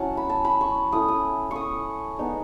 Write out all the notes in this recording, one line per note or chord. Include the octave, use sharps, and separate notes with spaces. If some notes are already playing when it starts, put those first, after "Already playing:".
Already playing: F#3 C#4 E4 F#5 A5
B5
A5
B5
C#6
A3 C#4 E4 D#6
D#6
C#6 D#6
G#3 B3 D#4